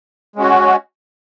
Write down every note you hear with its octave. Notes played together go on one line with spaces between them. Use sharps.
G#3 C#4 F#4